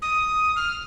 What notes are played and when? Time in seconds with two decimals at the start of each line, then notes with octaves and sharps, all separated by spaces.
0.02 D#6
0.56 F6